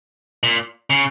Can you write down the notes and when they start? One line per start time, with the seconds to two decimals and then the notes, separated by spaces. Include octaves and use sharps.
0.43 A#2
0.90 C#3